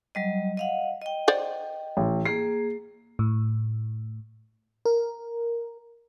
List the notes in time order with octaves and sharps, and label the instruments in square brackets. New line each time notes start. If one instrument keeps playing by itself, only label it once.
[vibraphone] F#3 G3 D#5
D#5 F5 F#5
D#5 G5
[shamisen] C5 D5 F#5
[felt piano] A1
[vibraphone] A#3 G#4 [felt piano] C7
[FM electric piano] A2
A#4